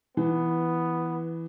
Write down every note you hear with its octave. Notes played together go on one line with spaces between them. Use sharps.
E3 B3